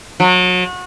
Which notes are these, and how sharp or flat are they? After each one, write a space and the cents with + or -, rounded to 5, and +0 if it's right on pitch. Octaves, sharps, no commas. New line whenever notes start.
F#3 -30